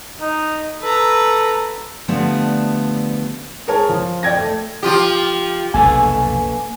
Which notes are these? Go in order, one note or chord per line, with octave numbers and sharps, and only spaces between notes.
D#4
A4 B4 A#5
D3 F3 G3 A3 B3
G#4 A#4 C#5 A5
F3
D5 G5 G#6 A#6
A3
F3 F4 G4
F1 B1 E2 A#3 A4 B4 G#5